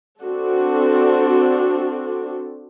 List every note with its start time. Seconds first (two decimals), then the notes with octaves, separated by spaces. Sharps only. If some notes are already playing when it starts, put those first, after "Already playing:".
0.20 C4 D4 F#4 A4